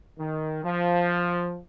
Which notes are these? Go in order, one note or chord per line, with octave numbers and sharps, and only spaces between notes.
D#3
F3